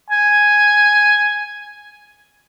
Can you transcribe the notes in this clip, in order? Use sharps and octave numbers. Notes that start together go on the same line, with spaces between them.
G#5